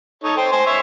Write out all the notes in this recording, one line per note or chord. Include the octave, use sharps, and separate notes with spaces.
D#4 A4 C#5
C5 G5
C5 G#5
C5 C#5 E5